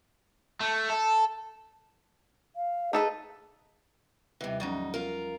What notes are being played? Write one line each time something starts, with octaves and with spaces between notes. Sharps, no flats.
A3
A4
F5
D#4 G#4 A4 B4
D#2 C3 E3 G3 D#5
D2 G#2 F3 F#3 C#4 D#4
F4 A#4